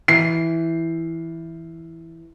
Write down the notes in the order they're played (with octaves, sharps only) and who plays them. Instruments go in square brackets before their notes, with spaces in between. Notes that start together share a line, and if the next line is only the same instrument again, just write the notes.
[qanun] E3 [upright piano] C7